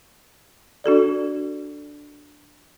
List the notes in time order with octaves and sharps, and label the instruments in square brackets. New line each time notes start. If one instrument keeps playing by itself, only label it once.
[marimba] D4 F#4 A4 D5